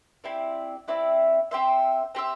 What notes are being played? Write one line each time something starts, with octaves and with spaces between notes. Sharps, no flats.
C4 E4 G4 D5
C4 E4 G4 D5
C4 G4 C5 E5
C4 G4 C5 E5